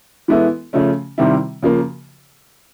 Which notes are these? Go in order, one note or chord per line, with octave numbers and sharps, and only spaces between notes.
E3 G#3 B3 E4 A4
C#3 F3 A3 C#4
C3 D#3 G3 C4 E4
C#3 F3 A#3